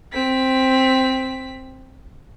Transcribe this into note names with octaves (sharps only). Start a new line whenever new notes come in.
C4 B6